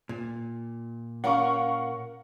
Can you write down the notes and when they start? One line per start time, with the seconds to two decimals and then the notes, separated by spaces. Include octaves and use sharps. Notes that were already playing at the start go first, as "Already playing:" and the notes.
0.09 A#2
1.24 C#4 A#4 F5 F#5 C#6